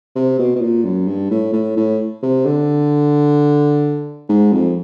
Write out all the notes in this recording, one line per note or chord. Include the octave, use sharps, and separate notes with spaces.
C3
B2
B2
A#2
F#2
G2
A2
A2
A2
C3
D3
G#2
F2